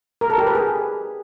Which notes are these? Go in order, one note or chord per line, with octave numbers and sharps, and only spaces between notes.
A#4
A4
G4
B4
G#4